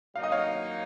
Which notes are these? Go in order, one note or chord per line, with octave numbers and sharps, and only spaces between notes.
F#3 A#3 D#4 F5
D#5
C#5 F5